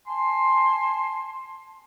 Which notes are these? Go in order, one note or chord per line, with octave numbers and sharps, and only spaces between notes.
G#5 A5 C6